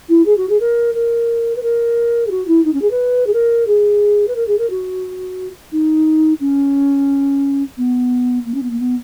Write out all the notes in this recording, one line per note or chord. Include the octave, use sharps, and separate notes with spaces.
E4
G#4
F#4
G#4
A#4
A#4
B4
A#4
G#4
F#4
E4
D#4
C#4
G#4
B4
G#4
A#4
G#4
B4
A#4
G#4
A#4
F#4
D#4
C#4
B3
A#3
C#4
B3
A#3
B3